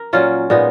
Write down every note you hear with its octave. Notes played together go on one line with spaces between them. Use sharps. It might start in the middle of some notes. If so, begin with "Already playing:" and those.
Already playing: A#4
A#2 F#3 C#4 F4
A#2 G#3 B3 D#4